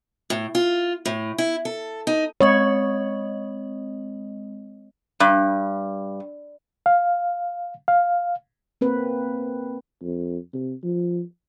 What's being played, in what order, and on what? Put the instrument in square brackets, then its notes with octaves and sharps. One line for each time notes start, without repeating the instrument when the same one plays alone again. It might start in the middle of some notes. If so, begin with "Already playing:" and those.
[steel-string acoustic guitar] A2
F4
A2
E4
A4
D#4
[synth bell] G#3 C4 D#5 [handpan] C#5
[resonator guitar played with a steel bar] G2
[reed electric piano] F5
F5
[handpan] A#3 C4 B4
[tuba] F2
C3
F3